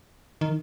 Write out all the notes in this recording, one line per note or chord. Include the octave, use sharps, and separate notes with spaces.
D#3